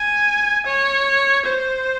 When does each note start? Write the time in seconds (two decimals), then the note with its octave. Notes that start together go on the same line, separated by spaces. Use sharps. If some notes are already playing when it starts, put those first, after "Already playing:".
Already playing: G#5
0.66 C#5
1.45 C5